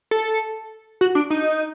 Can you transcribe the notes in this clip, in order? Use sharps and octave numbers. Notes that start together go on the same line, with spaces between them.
A4
F#4
D4
D#4